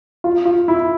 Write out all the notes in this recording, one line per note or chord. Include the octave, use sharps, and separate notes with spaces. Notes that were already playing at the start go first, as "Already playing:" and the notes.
F4
F4
E4